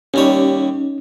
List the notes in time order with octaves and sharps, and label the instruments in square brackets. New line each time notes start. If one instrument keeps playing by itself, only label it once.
[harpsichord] D#2 G3 C#5 [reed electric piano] C#4 D#4